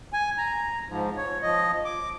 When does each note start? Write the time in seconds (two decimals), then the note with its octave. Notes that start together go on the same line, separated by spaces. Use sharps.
0.13 G#5
0.38 A#5
0.89 G#2 F3
1.17 C#5
1.43 F3 D#5
1.85 D6